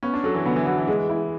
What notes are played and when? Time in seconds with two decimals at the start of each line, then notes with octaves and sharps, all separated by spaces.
0.03 B3 C#4
0.14 D4
0.24 F#3 A4
0.34 E3
0.45 D3 B3
0.56 E3
0.66 E3 F#4
0.78 E3
0.87 G#3
1.09 E4